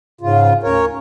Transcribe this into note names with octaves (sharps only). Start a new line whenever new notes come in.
G#2 C#3 F4
D2 C#4 A#4 C#5